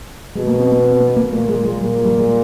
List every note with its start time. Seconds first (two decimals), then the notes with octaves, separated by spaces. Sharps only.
0.35 B2 G#3
0.47 A#3
0.60 C4
0.72 B3
0.84 C4
1.00 B3
1.16 A#3
1.32 A#2 A3
1.49 G#3
1.65 G#3
1.81 A#2 G3
2.05 G3
2.17 G#3